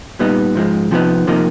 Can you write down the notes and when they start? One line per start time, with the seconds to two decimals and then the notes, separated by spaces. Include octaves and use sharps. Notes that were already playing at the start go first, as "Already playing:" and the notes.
0.19 A#2 G3 B3 D#4
0.55 G#2 F3 G#3
0.91 C3 F3 G#3 B3 D#4
1.27 C3 F3 A#3 D#4